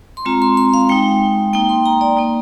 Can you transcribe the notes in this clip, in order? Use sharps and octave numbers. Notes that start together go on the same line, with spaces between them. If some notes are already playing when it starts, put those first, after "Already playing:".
C6
G#3 C4 F4 A#5
C6
C6
F5
G#3 D#4 G5
A#3 D#4 G5
C6
A#5
D5
A#3 D#4